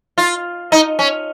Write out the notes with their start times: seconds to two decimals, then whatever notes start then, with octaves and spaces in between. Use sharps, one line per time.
0.18 F4
0.72 D#4
0.99 C#4